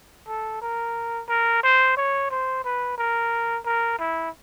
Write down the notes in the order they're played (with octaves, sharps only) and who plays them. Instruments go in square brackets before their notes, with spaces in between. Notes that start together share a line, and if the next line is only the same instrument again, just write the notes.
[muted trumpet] A4
A#4
A#4
C5
C#5
C5
B4
A#4
A#4
E4